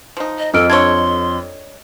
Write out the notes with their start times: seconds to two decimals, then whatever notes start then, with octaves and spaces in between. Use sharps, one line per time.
0.17 F3 D#4
0.39 D#5
0.54 F2 A4 D#5 F6 D7
0.70 D4 A4 C#5 C6 G#6